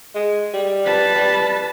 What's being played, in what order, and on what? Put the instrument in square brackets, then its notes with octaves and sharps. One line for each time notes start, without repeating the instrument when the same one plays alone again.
[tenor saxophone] G#3
G3
[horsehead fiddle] B4 A5
[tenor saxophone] G3